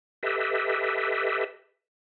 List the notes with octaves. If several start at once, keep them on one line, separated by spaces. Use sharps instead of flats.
G4 A4 B4 D#5 E5